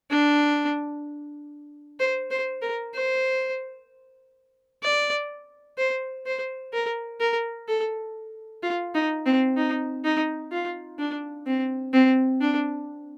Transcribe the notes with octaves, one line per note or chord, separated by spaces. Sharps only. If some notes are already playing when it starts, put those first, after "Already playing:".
D4
C5
C5
A#4
C5
D5
C5
C5
A#4
A#4
A4
F4
D#4
C4
D#4
D#4
F4
D4
C4
C4
D4